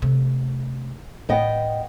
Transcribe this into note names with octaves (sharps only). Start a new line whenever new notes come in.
C3 A3
A2 B3 D#5 G5